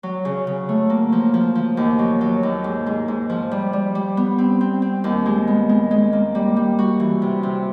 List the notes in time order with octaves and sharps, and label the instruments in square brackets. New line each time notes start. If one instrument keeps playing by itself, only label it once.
[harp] F#3
C#3
C#3
A3
A#3
F3
F3
F3
D#2
F#3
F#3
D#2
G#2
G#2
G#2
F3
G3
G3
G3
B3
C4
C4
C4
D#2
G#3
B3
G#3
G#3
A#3
G3
G3
F#4
E3
C3
C3